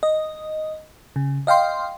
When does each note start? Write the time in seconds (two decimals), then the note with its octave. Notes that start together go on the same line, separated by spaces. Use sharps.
0.03 D#5
1.16 C#3
1.47 D#5 F5 G5 C6